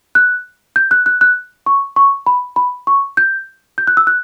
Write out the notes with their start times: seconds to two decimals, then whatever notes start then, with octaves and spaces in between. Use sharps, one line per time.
0.15 F#6
0.76 G6
0.91 F#6
1.06 F#6
1.21 F#6
1.66 C#6
1.96 C#6
2.27 B5
2.56 B5
2.87 C#6
3.17 G6
3.78 G6
3.87 F#6
3.97 E6
4.07 F#6